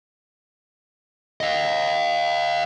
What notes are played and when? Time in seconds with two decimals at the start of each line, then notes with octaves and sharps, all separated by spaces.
1.40 D#5 F5